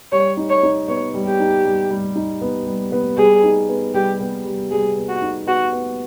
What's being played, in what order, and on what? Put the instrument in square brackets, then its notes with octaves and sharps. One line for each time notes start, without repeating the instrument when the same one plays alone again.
[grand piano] G3 [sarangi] C#5
[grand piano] D#4
[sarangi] C#5
[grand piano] D#4
[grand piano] B3 [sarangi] C#5
[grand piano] G3
[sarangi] G4
[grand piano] D#4
G3
G3
D#4
B3
G3
B3
[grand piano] G3 [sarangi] G#4
[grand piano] D#4
B3
[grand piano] G3 [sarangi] G4
[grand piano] B3
G3
[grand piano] G3 [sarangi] G#4
[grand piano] B3
[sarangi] F#4
[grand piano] D#4
[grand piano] B3 [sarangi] F#4
[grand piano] B3